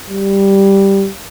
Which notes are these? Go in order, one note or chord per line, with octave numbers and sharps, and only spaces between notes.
G3